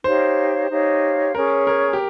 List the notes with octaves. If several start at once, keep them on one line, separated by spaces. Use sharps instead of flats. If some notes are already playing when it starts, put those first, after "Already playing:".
D#4 G4 C5 C#5 F5
D#4 G4 C#5 F5
C#4 G#4 A#4 C#5
A#4
G4